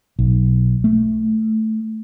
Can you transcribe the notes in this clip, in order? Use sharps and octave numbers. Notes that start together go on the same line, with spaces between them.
B1
A3